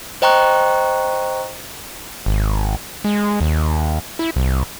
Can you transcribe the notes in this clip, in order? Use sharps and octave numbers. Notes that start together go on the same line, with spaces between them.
C5 D#5 G5 A#5 C#6 F#6
G#1
G#3
D#2
E4
C2